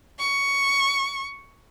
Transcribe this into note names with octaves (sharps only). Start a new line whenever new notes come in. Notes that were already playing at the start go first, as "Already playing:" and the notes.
C#6